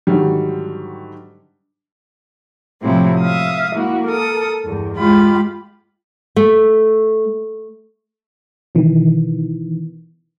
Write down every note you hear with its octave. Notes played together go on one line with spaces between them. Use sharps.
G#2 D3 D#3 F#3 G3
A2 C3 F3 F#3 C4 E4
E5 F5 D#6
A#3 E4 F#4
A4 A#4 D#6
E2 G2
G#3 F4 G4 B5
A3
B2 D#3 E3